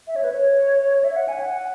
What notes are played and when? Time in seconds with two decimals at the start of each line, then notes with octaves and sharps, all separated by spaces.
0.07 E5
0.16 C#5
0.24 B4
0.32 C#5
1.04 E5
1.16 F#5
1.28 G#5
1.40 F#5